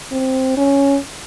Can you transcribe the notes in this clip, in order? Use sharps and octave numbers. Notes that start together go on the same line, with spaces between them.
C4
C#4